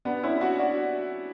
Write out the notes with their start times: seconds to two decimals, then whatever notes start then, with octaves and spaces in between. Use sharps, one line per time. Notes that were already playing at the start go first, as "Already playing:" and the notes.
0.05 B3 D4
0.23 C#4 E4
0.41 D4 F#4
0.59 D4 F#4